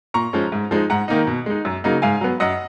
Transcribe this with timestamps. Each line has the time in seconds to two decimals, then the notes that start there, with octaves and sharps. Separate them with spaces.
0.14 A#2 A#5 C#6
0.33 F3 G#3 C#4
0.52 G#2
0.71 F3 G#3 D#4
0.90 G#2 F#5 A#5
1.08 D#3 A#3 D#4
1.27 B2
1.46 G#3 D#4
1.65 F#2
1.84 C#3 F#3 A#3 D#4
2.02 G#2 F5 G#5
2.21 F#3 B3
2.40 F#2 D#5 F#5